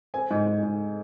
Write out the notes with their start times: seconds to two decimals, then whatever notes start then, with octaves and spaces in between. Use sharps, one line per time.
0.14 C4 G#5
0.31 G#2
0.47 G#2
0.63 G#2